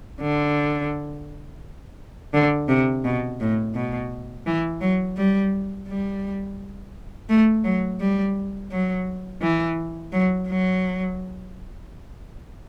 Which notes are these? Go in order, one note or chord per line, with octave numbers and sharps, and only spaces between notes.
D3
D3
C3
B2
A2
B2
E3
F#3
G3
G3
A3
F#3
G3
F#3
E3
F#3
F#3